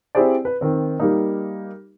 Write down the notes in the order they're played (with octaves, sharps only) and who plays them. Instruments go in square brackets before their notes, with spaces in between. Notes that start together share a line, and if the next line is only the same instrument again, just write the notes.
[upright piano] C4 E4 G4 G#4 C5 D5
B4
D#3 C4
G3 A#3 D#4